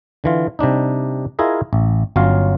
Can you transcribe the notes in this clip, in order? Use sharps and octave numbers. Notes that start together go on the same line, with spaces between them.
D3 E3 F4
C3 G3 D4 D#4
E4 F4 G#4 A#4 D#5
A1
G1 F#3 C#4 F4 F5